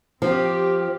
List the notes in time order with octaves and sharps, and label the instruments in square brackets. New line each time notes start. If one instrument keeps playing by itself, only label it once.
[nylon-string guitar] F3 [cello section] C4 G4